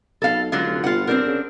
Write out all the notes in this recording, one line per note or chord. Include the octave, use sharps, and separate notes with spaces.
B1 A4 F5
C#2 D3 F#3 F4
F1
G1 F4 F#5
C4 D4 A#4
C#3